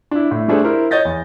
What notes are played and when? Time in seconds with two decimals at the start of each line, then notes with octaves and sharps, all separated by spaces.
0.11 D4 E4
0.31 A2
0.48 G3 A3 D4 G#4 A4 C5
0.64 E4 A#4 C5
0.91 C#5 D#5 G6 A6 A#6
1.05 E2